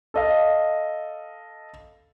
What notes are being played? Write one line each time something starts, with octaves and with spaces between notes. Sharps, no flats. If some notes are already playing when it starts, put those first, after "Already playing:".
A4 D#5 F5